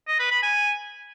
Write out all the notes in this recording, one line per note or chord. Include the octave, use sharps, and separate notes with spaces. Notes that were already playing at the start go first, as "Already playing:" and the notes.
D#5
B4
B5
G#5